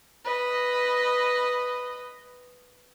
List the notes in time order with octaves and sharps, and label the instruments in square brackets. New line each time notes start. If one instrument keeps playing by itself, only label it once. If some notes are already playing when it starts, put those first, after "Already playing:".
[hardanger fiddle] B4 D#5